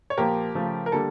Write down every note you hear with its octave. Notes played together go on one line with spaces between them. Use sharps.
C#5
A#2 F3 A#3 G4 A#4
C#3 F3 A3
A#4
D3 G3 A#3 A4